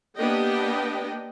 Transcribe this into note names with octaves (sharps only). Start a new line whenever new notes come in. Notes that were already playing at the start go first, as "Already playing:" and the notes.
A#3 B3 D4 G4 D#5 G5